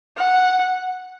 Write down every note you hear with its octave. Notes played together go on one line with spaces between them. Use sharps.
F#5